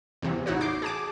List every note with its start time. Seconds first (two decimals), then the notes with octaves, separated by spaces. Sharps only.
0.22 E2 C3 E3
0.46 A1 D#4 E4 F#4 C#5
0.61 D6 G6 C7
0.82 G#4 A5 D6